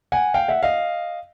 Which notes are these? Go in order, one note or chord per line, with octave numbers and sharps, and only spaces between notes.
F#5 G#5
F5 G5
E5 F#5
D#5 F5